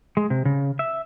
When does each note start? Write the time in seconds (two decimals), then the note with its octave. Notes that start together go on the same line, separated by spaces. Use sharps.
0.17 G#3
0.30 C3
0.45 C#3
0.79 E5